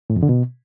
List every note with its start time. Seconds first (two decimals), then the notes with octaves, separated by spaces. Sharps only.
0.10 A2
0.16 F2
0.23 D3
0.29 B2